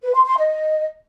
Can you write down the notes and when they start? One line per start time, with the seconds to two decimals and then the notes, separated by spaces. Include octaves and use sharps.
0.03 B4
0.14 C6
0.26 C6
0.37 D#5